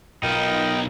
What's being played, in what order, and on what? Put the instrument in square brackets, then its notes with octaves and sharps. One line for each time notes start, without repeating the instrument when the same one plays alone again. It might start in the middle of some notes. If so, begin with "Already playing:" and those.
[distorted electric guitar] B1 [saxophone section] B3 F4 A#4 [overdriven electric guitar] D#4 [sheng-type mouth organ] G5